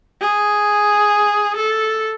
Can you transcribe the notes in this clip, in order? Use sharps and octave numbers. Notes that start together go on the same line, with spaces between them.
G#4
A4